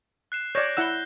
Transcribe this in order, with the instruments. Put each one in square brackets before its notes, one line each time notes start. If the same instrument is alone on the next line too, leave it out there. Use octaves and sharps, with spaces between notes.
[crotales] F#6 C7 E7
[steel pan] C#5 D5 [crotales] G6 A#6 E7
[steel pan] E4 F#5 E6 [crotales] E7 G7